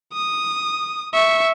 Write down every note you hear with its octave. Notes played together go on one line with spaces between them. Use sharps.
D#6
E5 C#6